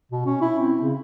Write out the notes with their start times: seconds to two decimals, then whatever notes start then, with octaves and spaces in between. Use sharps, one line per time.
0.12 B2
0.26 C#4
0.42 E4
0.59 C4
0.82 C#3